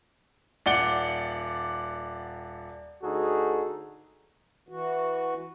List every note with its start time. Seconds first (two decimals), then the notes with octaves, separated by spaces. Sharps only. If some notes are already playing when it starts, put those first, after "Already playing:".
0.66 D#1 D5 F#5 D6 C#7 G7
3.03 D2 D#4 F#4 G#4 A4
4.69 E3 F#4